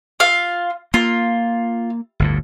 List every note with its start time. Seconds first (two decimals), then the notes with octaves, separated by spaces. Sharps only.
0.20 F4 F5
0.94 A#3 F4
2.20 G1 D2 A2